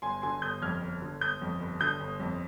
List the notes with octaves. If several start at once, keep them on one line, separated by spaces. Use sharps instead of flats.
G1 G#5 C6
D3 G#5 C6
G1 D#6 G6
F2 F6 G#6
G1
D3
G1 D#6 G6
F2
G1
D3 D#6 G6
G1
F2